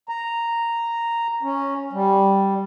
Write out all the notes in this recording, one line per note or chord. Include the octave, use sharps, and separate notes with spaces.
A#5
C#4
G3